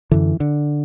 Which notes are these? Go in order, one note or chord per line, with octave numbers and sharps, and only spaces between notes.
F#2 D3 E3
D3